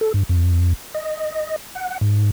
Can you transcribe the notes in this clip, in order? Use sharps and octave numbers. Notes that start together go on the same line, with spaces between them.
A4
G2
F2
D#5
F#5
G#2